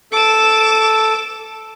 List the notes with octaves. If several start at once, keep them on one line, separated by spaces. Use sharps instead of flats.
A4 D6 E7